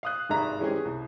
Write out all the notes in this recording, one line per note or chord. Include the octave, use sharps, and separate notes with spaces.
F5 D#6 F#6
G#1 G2 G#4 E5 A#5
E3 G#3 C4 C#4 G4 G#4
C2